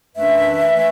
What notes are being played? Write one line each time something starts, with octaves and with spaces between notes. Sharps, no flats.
F#2 E3 A3 D4 B4 E5
E3 A3